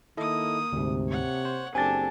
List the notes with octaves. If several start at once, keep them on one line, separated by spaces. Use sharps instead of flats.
D#3 A#3 E4 A4 D#5 D#6
D2 G#2 C3
C#5 F#5
C5
F#1 C4 D4 G4 A4 G#5 A6